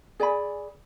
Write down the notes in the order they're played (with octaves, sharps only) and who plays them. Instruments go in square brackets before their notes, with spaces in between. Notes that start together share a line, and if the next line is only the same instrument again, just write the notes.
[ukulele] G#4 D5 G#5 B5